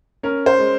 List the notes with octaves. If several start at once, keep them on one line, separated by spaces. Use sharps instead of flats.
C#4 A#4
C5
G#3